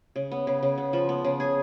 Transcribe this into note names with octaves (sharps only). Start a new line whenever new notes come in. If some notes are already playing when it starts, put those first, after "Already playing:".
C#3
B3
C#3
C#3
B3
F3
B3
C#3
G#4